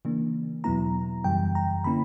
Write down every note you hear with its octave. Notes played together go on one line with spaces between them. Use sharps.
C#3 E3 A#3 D4
E2 B2 F#3 B3 E4 A#5
F#2 C#3 E3 G3 G5
A#5
D3 A#3 C#4 E4 B5